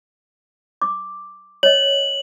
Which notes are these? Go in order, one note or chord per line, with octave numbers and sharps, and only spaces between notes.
D6
C#5 D#5 F#7